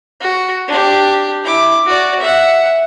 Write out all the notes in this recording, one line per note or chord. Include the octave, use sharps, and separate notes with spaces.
F#4
D4 G4
E4 D6
F#4 D5
E5 F#5